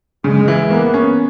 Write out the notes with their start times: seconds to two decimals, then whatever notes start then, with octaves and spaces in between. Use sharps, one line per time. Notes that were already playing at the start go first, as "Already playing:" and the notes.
0.24 C#3 G#3
0.48 E3
0.70 A#3 B3
0.94 C#4